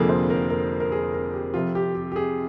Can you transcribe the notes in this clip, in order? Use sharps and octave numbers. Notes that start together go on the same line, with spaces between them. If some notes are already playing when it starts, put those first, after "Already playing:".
Already playing: F1 F2 D3 F3 A#3 G#4
C5
A#4
A#4
A#4
G#4
A#4
G4
F2 C3 F3 F4
G4
G4
G4
G#4